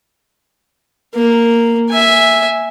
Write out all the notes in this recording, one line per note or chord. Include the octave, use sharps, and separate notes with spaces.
A#3
E5 G#5